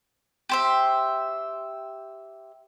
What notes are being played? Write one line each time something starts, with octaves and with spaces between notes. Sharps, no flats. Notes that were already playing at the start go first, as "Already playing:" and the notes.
G4 C5 E5